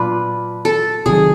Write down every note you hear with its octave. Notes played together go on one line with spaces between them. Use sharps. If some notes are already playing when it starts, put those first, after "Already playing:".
Already playing: A#2 F#3 B3 D4 F4 B4
A4
C3 D#3 F#3 G#4